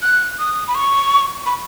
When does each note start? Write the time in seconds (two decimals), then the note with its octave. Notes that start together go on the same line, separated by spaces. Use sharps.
0.02 F#6
0.39 D#6
0.68 B5
0.75 C#6
1.46 B5